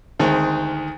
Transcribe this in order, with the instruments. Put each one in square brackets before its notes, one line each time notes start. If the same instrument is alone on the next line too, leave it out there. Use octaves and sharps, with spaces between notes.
[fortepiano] D2 D#3 G#3 C4